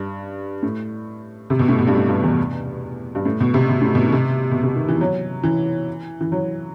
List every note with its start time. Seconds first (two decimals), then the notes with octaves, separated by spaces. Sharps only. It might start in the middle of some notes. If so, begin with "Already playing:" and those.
Already playing: G2
0.63 A2
1.50 C3
1.59 B2
1.68 A2
1.79 B2
1.87 G2
1.94 A2
2.09 G2
2.23 E2
3.15 G2
3.25 A2
3.40 B2
3.54 C3
3.69 B2
3.82 A2
3.95 B2
4.04 D#3
4.12 C3
4.51 B2
4.63 C3
4.76 D#3
4.89 E3
5.01 F#3
5.44 E3
6.21 E3
6.32 F#3